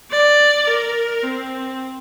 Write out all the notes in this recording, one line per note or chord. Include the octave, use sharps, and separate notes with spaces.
D5
A#4
C4